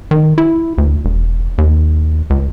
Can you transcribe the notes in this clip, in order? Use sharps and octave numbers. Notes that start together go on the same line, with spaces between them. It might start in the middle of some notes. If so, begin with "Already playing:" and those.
D#3
E4
D2
E1
D#2
C#2